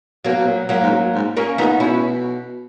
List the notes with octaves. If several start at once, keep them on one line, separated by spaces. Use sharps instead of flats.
B2 F#3 A#3
B2
A#2
A#2 F#3 A#3
G#2
F#2
G#2
A#2 A#3 C#4
A#2 B3 D#4
B2 C#4 E4